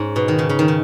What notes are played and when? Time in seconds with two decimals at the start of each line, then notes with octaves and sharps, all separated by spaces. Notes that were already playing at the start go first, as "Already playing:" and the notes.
Already playing: G#2 C#4
0.16 B2
0.28 D#3
0.39 C#3
0.49 C#3
0.59 D#3
0.68 C#3